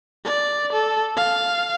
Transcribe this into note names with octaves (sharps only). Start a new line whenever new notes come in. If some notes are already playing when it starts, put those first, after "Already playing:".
D5
A4
F5